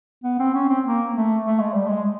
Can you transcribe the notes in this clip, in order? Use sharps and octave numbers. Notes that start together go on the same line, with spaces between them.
B3
C4
C#4
C4
A#3
A3
A3
G#3
G3
G#3